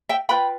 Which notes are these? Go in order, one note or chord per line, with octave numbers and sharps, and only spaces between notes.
E5 G5
F4 B4 G5 B5